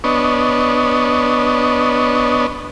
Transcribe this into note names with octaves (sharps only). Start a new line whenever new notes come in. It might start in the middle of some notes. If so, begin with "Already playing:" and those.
B3 D4 C#5 D#5